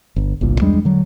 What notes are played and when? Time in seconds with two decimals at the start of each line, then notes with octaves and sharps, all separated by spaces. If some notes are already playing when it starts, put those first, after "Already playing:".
0.16 G1
0.41 G1 C2 A#2
0.61 E2 G3 G#3 D4
0.85 D3 F#3